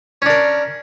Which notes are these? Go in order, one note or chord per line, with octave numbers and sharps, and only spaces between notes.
C#4 D4 A#4